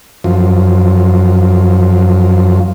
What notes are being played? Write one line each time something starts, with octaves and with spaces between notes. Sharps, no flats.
F#2 F3